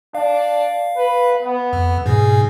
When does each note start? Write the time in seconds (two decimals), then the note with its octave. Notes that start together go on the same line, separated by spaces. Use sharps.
0.15 D4 F5
0.97 B4
1.42 B3
1.73 F2
2.06 G#2 B2 G#4